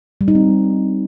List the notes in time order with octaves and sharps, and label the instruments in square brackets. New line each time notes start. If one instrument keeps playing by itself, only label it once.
[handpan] G3
D#4
C4